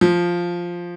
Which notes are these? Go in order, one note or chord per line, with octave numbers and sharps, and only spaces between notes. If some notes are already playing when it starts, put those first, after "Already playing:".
F3